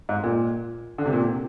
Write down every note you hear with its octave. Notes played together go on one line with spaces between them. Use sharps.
G#2
A#2
D3
C3
A#2
C3